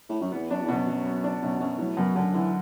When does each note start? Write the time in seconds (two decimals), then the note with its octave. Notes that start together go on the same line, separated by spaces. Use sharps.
0.09 A2
0.21 F#2
0.32 E2 B3
0.50 F#2 D4
0.61 E2
0.68 F#2 B2
0.87 F#3
1.06 B3
1.24 D4
1.42 F#2 B2
1.60 F#2 F#3
1.79 A2 F#3
1.97 F#2 B2
2.16 F#2 D3
2.34 D3 E3